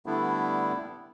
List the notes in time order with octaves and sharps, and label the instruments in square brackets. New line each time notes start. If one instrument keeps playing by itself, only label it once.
[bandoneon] D3 G3 A3 B3 D4 E4